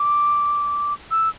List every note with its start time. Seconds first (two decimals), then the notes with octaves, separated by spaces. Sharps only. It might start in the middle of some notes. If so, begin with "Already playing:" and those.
Already playing: D6
1.11 E6